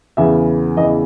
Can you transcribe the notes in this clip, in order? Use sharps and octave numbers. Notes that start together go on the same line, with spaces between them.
E2 C#3 E3 E5
E2 C#3 E3 D#5